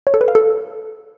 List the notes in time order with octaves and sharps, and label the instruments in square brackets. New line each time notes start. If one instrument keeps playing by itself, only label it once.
[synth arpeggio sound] C#5
A4
B4
F5
A4